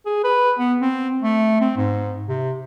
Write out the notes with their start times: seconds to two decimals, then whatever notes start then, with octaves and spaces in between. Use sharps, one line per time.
0.06 G#4
0.24 B4
0.59 B3
0.81 C4
1.22 A3
1.61 C4
1.77 G#2
2.28 C3